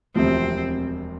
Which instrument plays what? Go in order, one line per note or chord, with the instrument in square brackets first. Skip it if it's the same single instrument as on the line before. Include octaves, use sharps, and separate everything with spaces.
[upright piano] E1 D2 C3 F3 [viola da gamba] C4